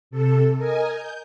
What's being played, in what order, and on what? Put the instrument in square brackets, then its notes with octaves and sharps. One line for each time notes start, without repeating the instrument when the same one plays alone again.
[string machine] C3 A4
A#4 D#5 G#5
G6